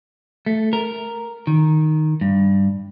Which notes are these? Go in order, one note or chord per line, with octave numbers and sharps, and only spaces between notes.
A3
A#4
D#3
G2